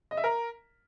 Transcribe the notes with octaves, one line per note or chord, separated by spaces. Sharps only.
D#5
E5
A#4